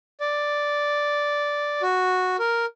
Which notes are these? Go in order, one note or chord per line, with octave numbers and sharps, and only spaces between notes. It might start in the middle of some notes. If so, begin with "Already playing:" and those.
D5
F#4
A#4